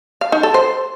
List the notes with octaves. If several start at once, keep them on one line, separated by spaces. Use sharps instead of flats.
F5
D#4
A4
C5